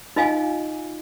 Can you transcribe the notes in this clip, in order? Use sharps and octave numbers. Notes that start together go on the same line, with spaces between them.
D#4 F4 D#5 F5 G#5